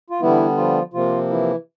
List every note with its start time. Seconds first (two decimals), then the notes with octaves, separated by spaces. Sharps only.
0.10 F4
0.21 D3 E3 G3 B3 E4
0.57 F3 F4
0.93 C3 F3 A#3 F4
1.30 E3 E4